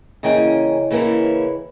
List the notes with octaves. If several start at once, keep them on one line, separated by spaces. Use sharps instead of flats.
C#3 E3 A#3 C#4 D#5 G5
C#3 E3 A#3 C#4 E4